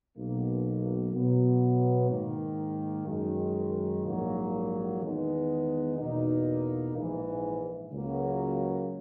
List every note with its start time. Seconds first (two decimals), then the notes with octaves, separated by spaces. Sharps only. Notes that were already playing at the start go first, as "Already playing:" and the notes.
0.17 B1 B2 A#3
1.13 B2 F#3 B3
2.10 G#2 D#3 A#3
3.07 F#2 D#3 G#3
4.04 A#1 G#2 F#3 A#3
5.01 E2 D#3 G#3 B3 D#4
5.98 E2 B2 A#3 D#4
6.94 A#1 G#2 E3
7.92 C#2 C#3 F#3 A#3